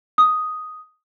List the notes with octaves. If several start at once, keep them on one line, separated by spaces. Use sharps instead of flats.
D#6